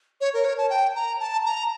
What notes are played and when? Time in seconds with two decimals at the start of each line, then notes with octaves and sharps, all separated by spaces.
0.21 C#5
0.34 A#4
0.45 C#5
0.58 A5
0.70 G5
0.95 A#5
1.20 A5
1.45 A#5